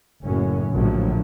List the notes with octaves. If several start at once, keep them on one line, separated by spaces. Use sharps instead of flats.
F#1 F#2 A2 C#4
A#1 A2 D3 F3 F#3